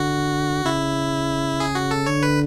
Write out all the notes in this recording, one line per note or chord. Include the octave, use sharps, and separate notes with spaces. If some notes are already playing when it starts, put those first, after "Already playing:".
Already playing: D3 F#4
C#3 E4
G#4
F#4
A4
D3 C#5
B4